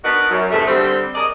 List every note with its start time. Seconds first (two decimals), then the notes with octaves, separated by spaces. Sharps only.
0.04 B3 D4 D#4 F#4 A#4 B4
0.30 F#2
0.50 E2 G2 C3 A3
0.67 D3 G3 C4
1.14 G#4 A#4 D5 D#5